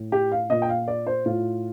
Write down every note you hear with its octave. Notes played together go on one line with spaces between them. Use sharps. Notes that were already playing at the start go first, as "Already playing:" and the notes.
Already playing: A2
G4
F5
A#2 D#5
G5
F5
D5
C5
A2 F4